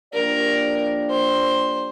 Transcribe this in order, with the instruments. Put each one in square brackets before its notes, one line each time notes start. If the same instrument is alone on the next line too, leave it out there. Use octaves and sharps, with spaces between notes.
[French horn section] F3 A#3 D4 G4 D5 [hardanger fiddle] A#4
[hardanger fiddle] C5